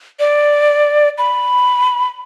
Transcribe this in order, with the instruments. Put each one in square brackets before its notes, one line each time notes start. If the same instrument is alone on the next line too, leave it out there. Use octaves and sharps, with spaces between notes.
[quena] D5
B5